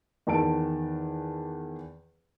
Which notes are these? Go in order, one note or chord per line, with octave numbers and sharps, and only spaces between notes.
E2 D#3 A5 D7